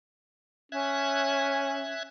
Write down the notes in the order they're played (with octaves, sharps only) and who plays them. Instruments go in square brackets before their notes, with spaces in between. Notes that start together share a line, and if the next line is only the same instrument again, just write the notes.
[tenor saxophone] C#4 [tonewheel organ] E5 F#6 G#6